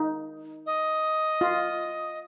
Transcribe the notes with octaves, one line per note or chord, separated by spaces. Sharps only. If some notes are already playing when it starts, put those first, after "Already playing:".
Already playing: D#4
D#5
F4